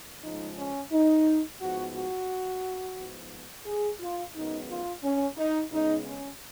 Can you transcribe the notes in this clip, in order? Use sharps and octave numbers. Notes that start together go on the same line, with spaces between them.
C#3 F3 G#3 D#4
C#4
D#4
G#2 F3 B3 F#4
F#4
G#2 F3 B3
G#4
F4
F#2 D#3 G#3 B3 D#4
F4
C#4
D#4
C#3 G#3 B3 D#4
C#4